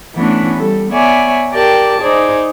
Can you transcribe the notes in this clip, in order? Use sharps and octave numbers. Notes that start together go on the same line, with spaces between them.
E3 A3 B3 C#4 D4
G3 A4
B3 C#5 D5 E5 G#5
G4 A#4 D5 G5 A5
D#4 G#4 C5 D5